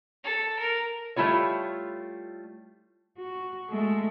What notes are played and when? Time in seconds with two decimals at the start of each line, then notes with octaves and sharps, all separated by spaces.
0.24 A4
0.59 A#4
1.16 G3 A3 E4 F4 C#5
3.18 F#4
3.70 G#3 A3